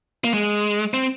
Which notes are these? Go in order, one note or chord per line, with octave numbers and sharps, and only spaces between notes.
A#3
G#3
C4